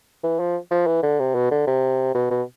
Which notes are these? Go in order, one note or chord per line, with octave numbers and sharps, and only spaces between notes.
E3
F3
F3
E3
D3
C3
B2
D3
C3
B2
B2